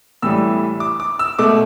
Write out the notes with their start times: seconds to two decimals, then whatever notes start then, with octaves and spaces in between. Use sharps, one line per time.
0.22 A2 E3 G3 E6
0.80 D6
1.00 D6
1.19 E6
1.39 B2 A3 D6